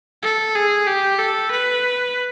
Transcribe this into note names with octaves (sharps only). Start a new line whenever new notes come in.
A4
G#4
G4
A4
B4